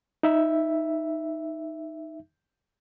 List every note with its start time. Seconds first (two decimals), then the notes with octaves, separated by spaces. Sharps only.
0.23 D#4 E5